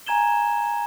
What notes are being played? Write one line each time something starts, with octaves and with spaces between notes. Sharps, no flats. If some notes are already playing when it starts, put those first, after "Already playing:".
G#5 A#5 G#6 E7 G7